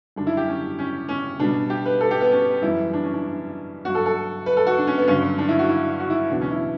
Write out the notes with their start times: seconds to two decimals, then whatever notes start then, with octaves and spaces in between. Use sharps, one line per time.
0.16 F#2 D3 G3 D4
0.27 E4
0.37 G4
0.48 C#4
0.79 C#4
1.09 C#4
1.39 B2 G3 D4
1.70 G4
1.85 B4
2.01 A4
2.11 G4
2.21 B3
2.31 C#4
2.62 F#2 E3 G3 E4
2.93 D4
3.03 C#4
3.14 D4
3.85 G2 F#3 F#4
3.95 A4
4.06 A4
4.46 B4
4.57 A4
4.67 F#4
4.77 D4
4.87 C#4
4.98 B3
5.07 G2 D3 F#3 C#4
5.38 D4
5.48 E4
5.59 F#4
5.69 E4
6.00 F#4
6.10 E4
6.20 E4
6.30 E2 B2 F#3 D4
6.41 C#4
6.51 E4